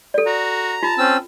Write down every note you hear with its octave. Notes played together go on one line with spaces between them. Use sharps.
A4 D5
F#4 A#5
F4 A5
C4 C#4 E6